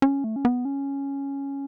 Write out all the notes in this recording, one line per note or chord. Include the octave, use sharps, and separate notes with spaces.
C#4
A3
C#4
B3
C#4